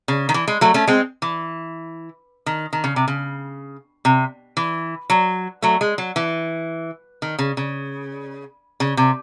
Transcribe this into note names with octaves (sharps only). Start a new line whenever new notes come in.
C#3
D#3
E3
G#3
F#3 A3
A3 C#4
G#3 C4
E3
D#3
D#3
C#3
C3
C#3
C3
E3
F#3
F#3 A3
G#3
F#3
E3
D#3
C#3
C#3
C#3
C3